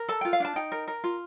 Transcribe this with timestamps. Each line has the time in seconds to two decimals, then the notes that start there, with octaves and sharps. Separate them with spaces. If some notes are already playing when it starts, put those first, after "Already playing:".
Already playing: A#4
0.08 A4 A5
0.21 F4 G5
0.33 F5
0.40 D4 A5
0.56 D#4 G5
0.72 A#4
0.88 A#4
1.04 F4